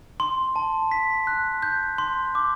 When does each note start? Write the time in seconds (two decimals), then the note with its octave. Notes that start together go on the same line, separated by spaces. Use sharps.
0.20 C6
0.56 A5
0.91 B6
1.27 F#6
1.62 G6
1.98 C6
2.35 D6